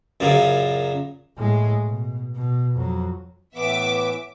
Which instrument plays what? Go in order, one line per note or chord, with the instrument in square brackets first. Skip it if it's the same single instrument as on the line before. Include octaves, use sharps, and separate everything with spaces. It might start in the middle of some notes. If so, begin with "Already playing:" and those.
[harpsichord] F#2 A#2 C#3
[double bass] A2 G#3
B2
B2
F2 F#3
[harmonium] A2 E3 B3 [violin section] E5 D6